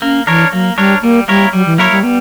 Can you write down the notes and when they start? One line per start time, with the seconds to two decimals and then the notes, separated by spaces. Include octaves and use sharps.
0.02 A#3 C#4
0.27 E3 D4 A#4 C#5
0.53 F#3 A#3
0.77 G3 D4 A#4 C#5
1.02 G3 A#3
1.28 G3 A#3 E4 A#4 C#5
1.53 F#3 G3
1.66 E3
1.78 F#3 A#3 E4 A#4 C#5
1.91 G3
2.03 G3 B3